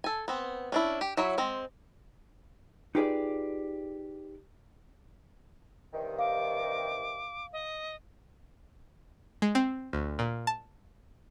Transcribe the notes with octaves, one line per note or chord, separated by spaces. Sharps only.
A4 G#5
B3 C4
C#4 D4 E4
G4
F#3 E4 C#5 E5
G#3 C4
D#4 F4 G4 G#4 B4 D5
G2 C3 D#3
F5 D6
D#5
G#3
C4
D2
A#2
A5